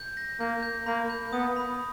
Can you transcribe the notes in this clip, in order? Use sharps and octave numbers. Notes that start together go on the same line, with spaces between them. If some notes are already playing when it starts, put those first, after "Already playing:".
Already playing: G6
A#6
A#3 G6
G6
A#3 B5
G6
B3 D#6
B5